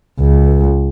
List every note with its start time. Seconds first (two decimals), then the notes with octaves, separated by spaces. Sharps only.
0.20 C#2